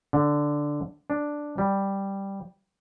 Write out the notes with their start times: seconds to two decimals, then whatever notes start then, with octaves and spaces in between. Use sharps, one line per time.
0.13 D3
1.10 D4
1.58 G3